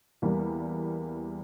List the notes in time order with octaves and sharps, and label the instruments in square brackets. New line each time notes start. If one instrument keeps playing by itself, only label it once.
[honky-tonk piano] E2 G3 A#3